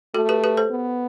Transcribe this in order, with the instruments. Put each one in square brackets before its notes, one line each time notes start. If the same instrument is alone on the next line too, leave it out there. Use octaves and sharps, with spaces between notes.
[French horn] A3 [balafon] F#4 A4
[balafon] G4 B4
G4 B4
A4 C5
[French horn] B3